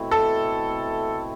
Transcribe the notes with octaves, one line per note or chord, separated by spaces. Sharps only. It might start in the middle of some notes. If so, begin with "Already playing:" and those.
Already playing: B2 A3 C4 E4
A4